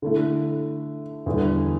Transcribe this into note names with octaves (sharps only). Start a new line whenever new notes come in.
D3 A3 E4
E2 D3 G3 B3